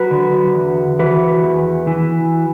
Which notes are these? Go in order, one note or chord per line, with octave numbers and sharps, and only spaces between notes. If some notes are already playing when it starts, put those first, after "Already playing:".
Already playing: F#3 F#4 B4
D3
E2
E3 F#4 B4
E2
E3